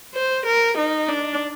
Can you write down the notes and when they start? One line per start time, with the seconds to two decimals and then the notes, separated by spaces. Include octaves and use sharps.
0.15 C5
0.46 A#4
0.77 D#4
1.09 D4